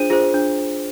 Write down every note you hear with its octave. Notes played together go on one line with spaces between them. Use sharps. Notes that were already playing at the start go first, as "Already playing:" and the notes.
Already playing: D4 F4 G#4 C5 D#7
F4 G#4 C5
D4